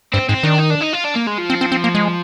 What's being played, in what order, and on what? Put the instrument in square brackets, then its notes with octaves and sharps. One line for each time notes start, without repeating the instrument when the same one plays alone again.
[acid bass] G2 [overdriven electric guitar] C4
[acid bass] G#2 [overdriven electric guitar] C4
[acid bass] D#3 [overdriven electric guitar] D4
[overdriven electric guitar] D#4
D4
D#4
F4
D4
A#3
G#3
F3
[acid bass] C4
C4
C4
A#3
G#3